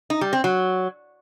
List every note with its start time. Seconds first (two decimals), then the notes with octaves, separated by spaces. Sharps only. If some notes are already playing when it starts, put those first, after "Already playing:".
0.10 D#4
0.21 G3
0.33 C4
0.44 F#3